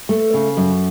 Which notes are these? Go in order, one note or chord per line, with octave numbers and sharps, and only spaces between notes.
A3
C#3
F#2